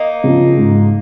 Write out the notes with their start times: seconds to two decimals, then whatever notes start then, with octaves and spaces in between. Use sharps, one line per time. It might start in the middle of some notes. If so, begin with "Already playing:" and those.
Already playing: A#3 D#4
0.24 C#3 F3
0.57 G#2